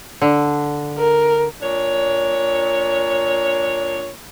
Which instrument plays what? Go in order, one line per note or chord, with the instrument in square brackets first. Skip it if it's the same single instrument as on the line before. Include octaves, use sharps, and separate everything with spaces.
[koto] D3
[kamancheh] A#4
[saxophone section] A#2 D4 C#5